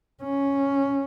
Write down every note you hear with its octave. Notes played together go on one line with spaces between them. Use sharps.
C#4